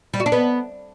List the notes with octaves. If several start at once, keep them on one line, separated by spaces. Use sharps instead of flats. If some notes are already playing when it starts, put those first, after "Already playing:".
G3
F#4
D4
B3